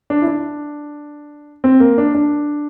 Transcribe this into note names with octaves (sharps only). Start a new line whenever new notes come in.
D4
E4
D4
C4
A#3
D4
D4